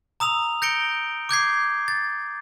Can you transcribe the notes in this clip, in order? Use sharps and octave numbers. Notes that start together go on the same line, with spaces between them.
A#5 D#6 E6 F7
G6 A#6 C#7 D7 G7
D6 G6 G#6 C7
A6